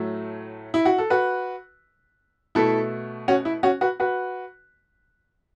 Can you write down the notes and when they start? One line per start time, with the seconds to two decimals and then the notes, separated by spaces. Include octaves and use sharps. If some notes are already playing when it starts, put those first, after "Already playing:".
Already playing: A2 F#3 A3
0.74 E4
0.85 F#4
0.98 A4
1.10 F#4 B4
2.55 B2 A3 E4 A4
3.28 C#4 F#4
3.45 E4
3.63 C#4 F#4
3.81 F#4 B4
4.00 F#4 B4